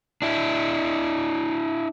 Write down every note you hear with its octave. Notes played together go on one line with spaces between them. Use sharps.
D4 E4